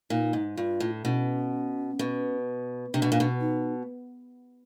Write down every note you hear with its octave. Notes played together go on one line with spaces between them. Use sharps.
A#2 D#4
G#2
G2 F4
A2
B2 C#4
B2
C3 D4
B2
A#2
B2
D#4